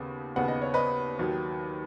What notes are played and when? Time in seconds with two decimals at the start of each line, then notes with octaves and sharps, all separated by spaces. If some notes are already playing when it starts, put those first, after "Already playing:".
Already playing: D#2 C#3 B3
0.36 D#2 C#3 B3 F#5
0.48 D#5
0.62 C#5
0.74 B4 D#5
1.19 D#2 D#3 F#3